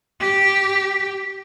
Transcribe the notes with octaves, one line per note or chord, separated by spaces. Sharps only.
G4